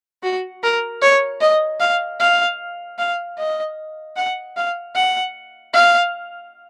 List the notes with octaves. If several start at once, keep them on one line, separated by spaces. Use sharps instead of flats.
F#4
A#4
C#5
D#5
F5
F5
F5
D#5
F#5
F5
F#5
F5